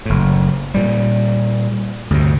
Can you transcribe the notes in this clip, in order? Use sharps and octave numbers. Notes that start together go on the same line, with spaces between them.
F#1 A2
A#2 G3
D2 G2 C3